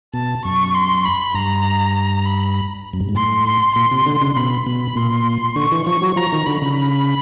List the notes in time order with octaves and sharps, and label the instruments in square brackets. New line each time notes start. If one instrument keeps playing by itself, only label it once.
[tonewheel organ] B2 [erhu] A5
[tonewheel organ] F#2 [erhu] C#6
[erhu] C6
B5
[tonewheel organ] G2 [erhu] A#5
[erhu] A#5
B5
[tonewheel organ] F#2
G2
G#2
[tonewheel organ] A2 [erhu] C6
[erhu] C6
[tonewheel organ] A#2 [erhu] C6
[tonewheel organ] C3
D3
C#3
[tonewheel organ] B2 [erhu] B5
[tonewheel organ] B2
[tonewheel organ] A#2 [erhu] C6
[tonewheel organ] D3 [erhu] C#6
[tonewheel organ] E3
[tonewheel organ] F3 [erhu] C#6
[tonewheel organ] F#3
[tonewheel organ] F3 [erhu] A#5
[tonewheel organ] D#3
[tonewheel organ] D3 [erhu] B5
[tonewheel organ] C#3